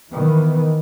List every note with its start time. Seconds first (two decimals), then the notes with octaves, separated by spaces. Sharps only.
0.11 D#3 E3 B3